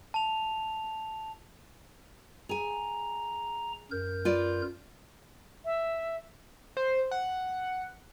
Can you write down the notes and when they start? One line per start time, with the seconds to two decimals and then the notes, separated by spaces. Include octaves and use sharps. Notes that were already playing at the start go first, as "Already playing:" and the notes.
0.14 A5 F7
2.49 G#4 G#5 A#5
3.91 F#2 A#4 G6
4.25 F4 B4 D5
5.65 E5
6.77 C5
7.11 F#5